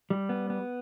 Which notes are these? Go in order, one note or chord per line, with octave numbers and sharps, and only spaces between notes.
G3
B3
B3